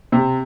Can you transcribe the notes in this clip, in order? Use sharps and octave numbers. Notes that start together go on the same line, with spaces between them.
C3